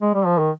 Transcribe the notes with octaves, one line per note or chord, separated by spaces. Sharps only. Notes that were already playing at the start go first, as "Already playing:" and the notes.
G#3
G3
F3
D#3